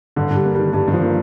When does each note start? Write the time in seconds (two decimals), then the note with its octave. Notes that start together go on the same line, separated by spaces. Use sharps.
0.16 G2 D3
0.30 G2
0.36 G3
0.45 A#3
0.55 D#3 G3
0.73 G2 G3
0.88 G2
0.93 F3
1.02 A#3